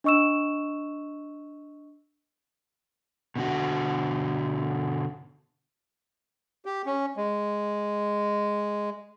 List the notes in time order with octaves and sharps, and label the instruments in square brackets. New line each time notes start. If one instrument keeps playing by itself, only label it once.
[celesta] D4 D#5 C#6 E6 E7
[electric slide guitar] B2 D3 F#4
[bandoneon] G4
C#4
G#3